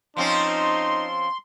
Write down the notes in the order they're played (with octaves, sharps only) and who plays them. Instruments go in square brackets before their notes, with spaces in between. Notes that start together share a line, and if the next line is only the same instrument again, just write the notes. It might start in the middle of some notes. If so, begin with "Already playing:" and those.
[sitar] F3 C4 C#4 [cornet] D#4 [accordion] C6